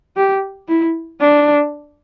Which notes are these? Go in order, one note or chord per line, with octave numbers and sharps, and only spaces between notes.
G4
E4
D4